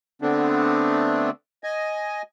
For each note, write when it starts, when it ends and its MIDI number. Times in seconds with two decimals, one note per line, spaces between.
0.22 1.30 50
0.22 1.30 57
0.22 1.30 59
0.22 1.30 60
0.22 1.30 62
1.64 2.22 75
1.64 2.22 80